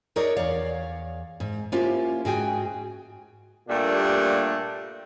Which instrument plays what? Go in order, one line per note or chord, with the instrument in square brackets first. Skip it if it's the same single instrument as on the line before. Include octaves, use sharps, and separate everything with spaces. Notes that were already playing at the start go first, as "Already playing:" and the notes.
[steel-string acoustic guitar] D#4 G#4 A#4 C#5 D5 A#5
E2 C#5 D5 F5
G#2
A#3 C#4 E4 F4 G4 C5
G#2 F#4 G#4 G5 G#5
[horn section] G2 A#2 G3 A3 A#3 D4